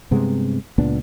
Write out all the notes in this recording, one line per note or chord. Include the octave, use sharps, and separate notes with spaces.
G2 C3 G#3 B3
C#2 A#2 B3 D4